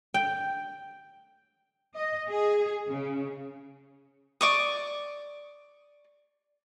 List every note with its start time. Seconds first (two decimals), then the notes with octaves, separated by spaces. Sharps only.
0.14 G5
1.95 D#5
2.30 G#4
2.88 C#3
4.41 D5 C#6 D#6